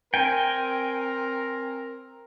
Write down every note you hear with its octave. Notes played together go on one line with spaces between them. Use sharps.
C4 A#4 G5 G#5